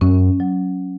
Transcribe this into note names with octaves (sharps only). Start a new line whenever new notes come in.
F#2 C#4
F#3